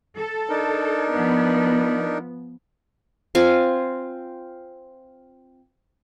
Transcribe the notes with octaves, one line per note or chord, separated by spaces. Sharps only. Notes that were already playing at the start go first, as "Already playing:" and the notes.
A4
D4 D#4 A#4
F3 B3
C4 F4 F5 G#5